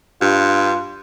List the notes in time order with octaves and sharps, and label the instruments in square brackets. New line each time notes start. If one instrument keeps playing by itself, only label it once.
[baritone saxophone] G2 [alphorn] F4